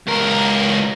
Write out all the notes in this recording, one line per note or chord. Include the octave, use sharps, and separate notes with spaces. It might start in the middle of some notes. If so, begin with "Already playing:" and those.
C#2 A#4